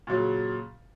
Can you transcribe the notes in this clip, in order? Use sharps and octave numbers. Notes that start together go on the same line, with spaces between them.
A#2 C#3 F#3